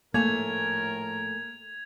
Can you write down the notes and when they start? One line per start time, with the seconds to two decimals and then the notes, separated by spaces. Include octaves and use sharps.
0.14 A#1 A2 A3 A#3 A#4 G#5 G#6 F7